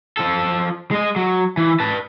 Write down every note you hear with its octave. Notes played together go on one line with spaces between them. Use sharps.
F3 A4
G#3 D#5
F#3
E3
B4 A5